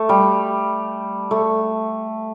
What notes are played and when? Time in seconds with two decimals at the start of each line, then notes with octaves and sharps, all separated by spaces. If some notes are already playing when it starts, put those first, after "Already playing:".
Already playing: A3
0.09 G3
1.31 A3